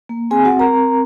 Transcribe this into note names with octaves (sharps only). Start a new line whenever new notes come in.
A#3
C4 G#4 G#5
F#4 F#5
C4
A#4 A#5
C4